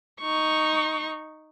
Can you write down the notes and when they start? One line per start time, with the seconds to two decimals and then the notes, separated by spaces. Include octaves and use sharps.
0.21 D#4 C#6